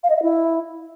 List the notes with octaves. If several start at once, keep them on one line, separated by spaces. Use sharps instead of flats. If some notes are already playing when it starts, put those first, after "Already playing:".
F5
D#5
E5
E4